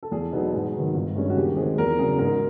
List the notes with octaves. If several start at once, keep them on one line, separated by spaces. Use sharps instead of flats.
A4
E2 G#4
B2 F#3 B3 D#4
G#2 G#4
D#3 F#3 B3
G1
G2 D#3 G#3 C#4
F#4
D#2 G4
D#3 G#3 C4 G#4
E2 A#4
C#3 F#3 G#4
G#2 A#4